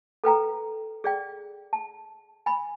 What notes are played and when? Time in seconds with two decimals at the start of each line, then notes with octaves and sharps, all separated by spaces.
0.24 A4 B4 G5 A#5
1.04 G#4 D5 G5
1.73 A5
2.46 G#5 B5